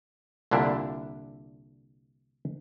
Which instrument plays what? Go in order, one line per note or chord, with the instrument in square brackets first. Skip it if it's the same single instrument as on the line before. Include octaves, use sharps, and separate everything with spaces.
[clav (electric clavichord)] C2 A#2 D3 D4 E4